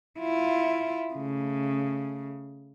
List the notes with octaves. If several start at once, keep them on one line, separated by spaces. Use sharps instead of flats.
E4 F4
C#3 A3